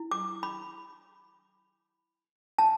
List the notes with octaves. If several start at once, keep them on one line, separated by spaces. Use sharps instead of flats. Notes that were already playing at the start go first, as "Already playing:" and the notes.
Already playing: E4
D6
B5
A5